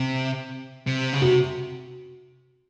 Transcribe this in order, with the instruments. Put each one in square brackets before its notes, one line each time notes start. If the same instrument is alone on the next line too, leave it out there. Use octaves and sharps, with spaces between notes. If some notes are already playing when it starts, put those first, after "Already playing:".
Already playing: [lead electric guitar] C3
C3
C#3
[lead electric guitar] C3 [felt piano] F#4